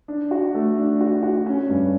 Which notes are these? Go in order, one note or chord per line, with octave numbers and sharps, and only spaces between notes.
D4
F#4
A3
D4
F#4
F#4
C#4
G2